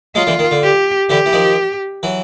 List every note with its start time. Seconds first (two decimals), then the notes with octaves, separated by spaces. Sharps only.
0.15 F#3 G#3 F4
0.27 D3 E3
0.39 D#3
0.51 D3
0.63 G4
1.10 D3 E3 G4
1.26 E3
1.33 D#3 F3
2.03 E3 F#3